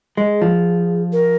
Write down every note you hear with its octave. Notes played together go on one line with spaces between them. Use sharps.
G#3 G#4
F3
A#4